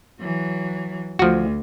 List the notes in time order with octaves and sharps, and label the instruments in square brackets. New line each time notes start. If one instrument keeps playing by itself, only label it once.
[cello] E3 F#3
[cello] D2 [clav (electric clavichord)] F3 F#4